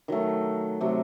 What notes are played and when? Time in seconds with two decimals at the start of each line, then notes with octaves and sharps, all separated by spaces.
0.08 D#3 F#3 A3
0.81 C3 F#3 A3